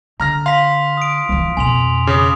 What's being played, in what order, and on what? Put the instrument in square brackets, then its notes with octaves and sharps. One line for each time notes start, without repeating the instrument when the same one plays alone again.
[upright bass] D3 [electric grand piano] A#5 F6 A#6
[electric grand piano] F5 [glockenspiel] C6 B6
[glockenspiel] D#6 D7
[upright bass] E3 F3
[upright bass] F2 B2 [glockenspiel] G#5 C6 F7
[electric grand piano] C#3 [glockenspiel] D6 D#6